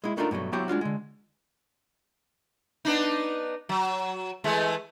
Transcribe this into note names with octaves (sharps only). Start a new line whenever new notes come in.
G#3 E4
A3 D4 D#4 F4 A4 A#4
G2 B2 F#3 A3
F#3 B3 E4 F#4 G4 C5
G#3 D4 F4 F#4
D3 G#3
B3 D4 D#4
F#3
E3 G#3 A3